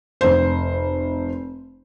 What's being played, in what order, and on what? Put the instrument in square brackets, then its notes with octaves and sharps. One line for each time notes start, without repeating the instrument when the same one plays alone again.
[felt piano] F1 C5